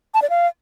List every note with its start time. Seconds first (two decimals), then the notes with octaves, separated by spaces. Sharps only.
0.14 A5
0.22 D5
0.30 F5